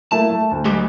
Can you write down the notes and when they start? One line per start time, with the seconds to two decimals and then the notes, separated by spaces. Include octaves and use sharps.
0.12 A3 A#3 E4 A5
0.30 A3
0.51 D2
0.65 F#3 G#3 G4